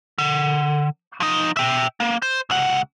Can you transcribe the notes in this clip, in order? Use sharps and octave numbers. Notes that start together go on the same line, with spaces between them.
D3
F3 D#4
E5 G5
A#3
C5
C#2 F#5